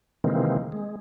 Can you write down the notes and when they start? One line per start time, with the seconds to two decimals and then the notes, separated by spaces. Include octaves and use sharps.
0.24 C3 D#3 E3 G#3 A#3 C4
0.72 G#3